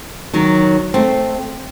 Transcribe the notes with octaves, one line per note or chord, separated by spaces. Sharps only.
D#3 F#3
A3 C4